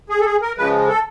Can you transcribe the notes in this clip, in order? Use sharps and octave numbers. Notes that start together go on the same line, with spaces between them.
G#4
A4
G#4
A#4
C#3 F3 G#3 B4
A4